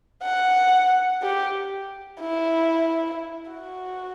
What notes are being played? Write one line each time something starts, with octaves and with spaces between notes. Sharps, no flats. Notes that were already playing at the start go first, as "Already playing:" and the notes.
F#5
G4
E4
F#4